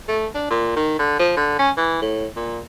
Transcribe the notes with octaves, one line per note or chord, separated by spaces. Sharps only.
A3
D4
A#2
D#3
D3
F3
D3
C#4
E3
A2
A#2